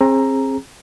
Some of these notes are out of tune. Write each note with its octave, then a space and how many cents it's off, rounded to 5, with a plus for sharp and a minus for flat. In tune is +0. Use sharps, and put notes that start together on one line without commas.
C4 +35 G#4 +0 A#5 +0